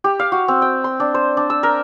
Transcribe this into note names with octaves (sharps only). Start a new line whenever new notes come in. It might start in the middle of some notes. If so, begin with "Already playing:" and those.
G4
F5
F#4
C4
G5
C6
D4
C5
D4
E6
A#4